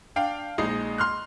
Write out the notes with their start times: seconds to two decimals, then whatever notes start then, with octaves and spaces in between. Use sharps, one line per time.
0.16 D4 F5 G5
0.58 A#1 G#3 D#4 D#5 C7
0.98 C6 F6 F#6